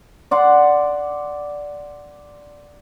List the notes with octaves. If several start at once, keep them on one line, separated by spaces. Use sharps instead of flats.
D5 F#5 C6